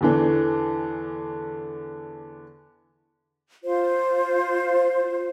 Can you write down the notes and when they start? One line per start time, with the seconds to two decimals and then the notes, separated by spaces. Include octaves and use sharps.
0.01 E2 D3 E3
3.64 F4 C5